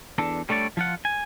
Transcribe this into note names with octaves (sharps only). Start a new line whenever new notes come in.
E2 D4 A4
G3 A3 D4 C#5 D5
F3 F4 F#5
G#5